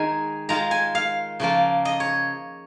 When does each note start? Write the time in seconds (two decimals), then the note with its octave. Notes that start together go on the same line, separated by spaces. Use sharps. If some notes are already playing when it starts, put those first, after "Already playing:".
Already playing: D#3 G#3 D#4 G#4 A#4 G#5
0.49 D#3 G#3 F4 A#5
0.71 G#5
0.95 F5
1.40 C#3 F3 A#3 F4
1.85 D#5
2.00 C#5